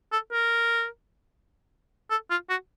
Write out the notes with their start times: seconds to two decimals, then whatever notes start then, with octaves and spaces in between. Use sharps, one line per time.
0.12 A4
0.32 A#4
2.10 A4
2.30 F4
2.49 F#4